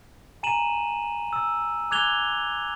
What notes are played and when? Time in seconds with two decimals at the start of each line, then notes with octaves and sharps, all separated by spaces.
0.43 G#5 A#5 D#7 E7 F#7
1.33 E6
1.90 G#5 D6 F#6 G#6 F7 G7